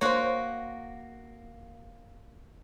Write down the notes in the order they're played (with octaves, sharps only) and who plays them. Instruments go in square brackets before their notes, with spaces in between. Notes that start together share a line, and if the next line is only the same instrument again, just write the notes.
[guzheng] A#3 F#4 [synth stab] C5 C#5